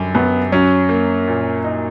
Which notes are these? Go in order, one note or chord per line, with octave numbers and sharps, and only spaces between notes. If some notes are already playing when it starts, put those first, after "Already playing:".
Already playing: F#2 D3 G3
F#2 B3
F#3 C#4
A#3
A#2
D#4